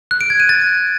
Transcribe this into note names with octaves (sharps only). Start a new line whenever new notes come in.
F#6
D7
G#6
D#7
A6